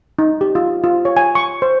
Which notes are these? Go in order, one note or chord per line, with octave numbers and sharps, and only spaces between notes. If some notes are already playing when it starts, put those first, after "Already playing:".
D#4
G4
F4
F4
C#5
G#5
C#6
C5